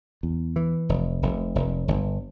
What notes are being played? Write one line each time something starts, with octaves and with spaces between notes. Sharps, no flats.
E2
E3
F1
F1
F1
G1